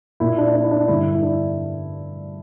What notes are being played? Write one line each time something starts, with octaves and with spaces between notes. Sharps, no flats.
A#2 E4
D4
D4
E4
D4
G2 D3 E4
E4
D4